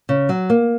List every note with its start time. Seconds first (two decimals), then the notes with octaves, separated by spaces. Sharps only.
0.09 C#3
0.29 F#3
0.50 A#3